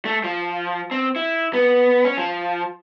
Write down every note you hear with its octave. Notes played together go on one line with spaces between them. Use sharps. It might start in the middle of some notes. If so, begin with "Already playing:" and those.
A3
F3
C4
E4
B3
C#4
F3